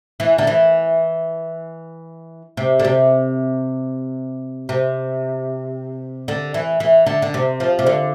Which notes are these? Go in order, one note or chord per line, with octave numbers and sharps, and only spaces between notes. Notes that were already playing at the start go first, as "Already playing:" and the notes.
E3
D3
E3
C3
D3
C3
C3
D3
E3
E3
D3
D3
C3
F3
C3
D3